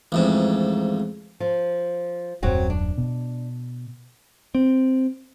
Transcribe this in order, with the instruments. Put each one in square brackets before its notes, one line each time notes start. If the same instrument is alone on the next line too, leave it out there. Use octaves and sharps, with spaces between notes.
[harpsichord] A1 F2 G#2
[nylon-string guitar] F3
[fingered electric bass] D#1 F#2 [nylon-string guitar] F#3 C4 F#4
[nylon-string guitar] D4
[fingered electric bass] B2
[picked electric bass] C4